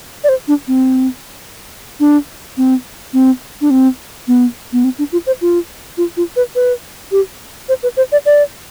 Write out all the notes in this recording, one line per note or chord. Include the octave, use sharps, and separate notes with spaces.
D5
C5
D4
C4
D4
C4
C4
D4
C4
B3
B3
C4
D4
F4
C5
F4
F4
F4
B4
B4
G4
C5
B4
C5
D5
D5